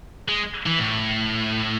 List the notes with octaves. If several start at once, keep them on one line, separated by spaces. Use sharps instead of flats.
G#3
E3
A2